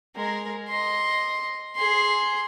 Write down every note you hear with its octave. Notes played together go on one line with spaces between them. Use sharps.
G#3 A#4
D#5 C6
G#4 C6